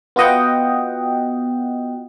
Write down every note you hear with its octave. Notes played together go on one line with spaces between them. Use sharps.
B3 F4 F#4 D#5 F#5 G5